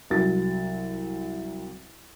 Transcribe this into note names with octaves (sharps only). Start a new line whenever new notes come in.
C2 F#3 A6